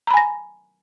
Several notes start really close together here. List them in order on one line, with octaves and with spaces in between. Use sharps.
A#5 B5 G#5 A#6